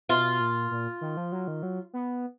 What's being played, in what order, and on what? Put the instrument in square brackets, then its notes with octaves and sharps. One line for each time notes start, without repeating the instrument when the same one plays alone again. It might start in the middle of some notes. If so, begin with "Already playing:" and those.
[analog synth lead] B2 [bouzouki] F4
[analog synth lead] A#2
A#2
D#3
F3
F#3
D#3
F#3
B3